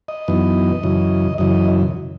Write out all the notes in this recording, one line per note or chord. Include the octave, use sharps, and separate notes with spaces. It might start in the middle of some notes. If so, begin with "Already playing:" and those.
D#5
F#2 E3 B3 D#4
F#2 C#3 E3
F#2 C#3 E3 D#5